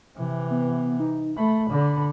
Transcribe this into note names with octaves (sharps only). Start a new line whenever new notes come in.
C3 E3
B3
D#4
A3 B5
D3